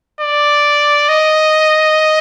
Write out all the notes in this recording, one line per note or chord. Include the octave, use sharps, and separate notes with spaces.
D5
D#5